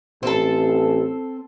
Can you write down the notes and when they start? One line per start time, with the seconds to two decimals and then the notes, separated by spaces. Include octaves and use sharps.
0.23 A1 C4 A4